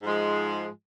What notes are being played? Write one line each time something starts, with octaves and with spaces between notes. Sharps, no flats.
G#2 F3 G#3